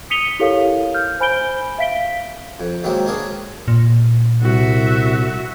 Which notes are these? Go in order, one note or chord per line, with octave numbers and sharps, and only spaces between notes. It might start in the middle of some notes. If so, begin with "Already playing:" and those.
D#6 B6 C#7 D#7 F7 G7
E4 G4 A4 A#4 C#5 F5
F6 G6
C5 G#5 B5 G6 D7 G7
E5 F5 B6 D7 G7
F2
D#3 F#3 G#3 A#3 C4
C#4 D4 G#4 A#4
A#2
C2 F#4 E5